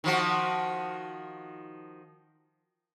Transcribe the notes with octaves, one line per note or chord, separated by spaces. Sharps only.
D#3 F3 F#4